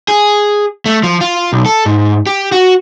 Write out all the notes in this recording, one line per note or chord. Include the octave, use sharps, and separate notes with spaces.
G#4
A3
F3
F4
B1
A4
G#2
G4
F#4